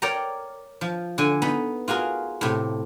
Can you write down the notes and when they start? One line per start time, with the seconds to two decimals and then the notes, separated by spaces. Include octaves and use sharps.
0.02 A#4 C#5 D5 G5 A#5
0.81 F3
1.18 D3 G#5
1.42 B3 D#4 B5
1.88 F4 F#4 G#4 A#4
2.41 A2 C3